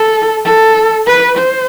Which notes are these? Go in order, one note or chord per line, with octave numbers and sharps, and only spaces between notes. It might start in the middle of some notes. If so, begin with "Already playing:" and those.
Already playing: A4
A4
B4
C5